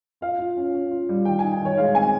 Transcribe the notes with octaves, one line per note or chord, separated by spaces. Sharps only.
F4 F5
F4
C#4
C#4
F4
G3
D#3 G5
G#5
D#4
G#5
D#3 C#5
G#3 F5
C4 G#5